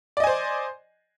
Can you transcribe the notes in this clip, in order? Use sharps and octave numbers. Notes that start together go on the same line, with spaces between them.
C5 D5 D#5 G#5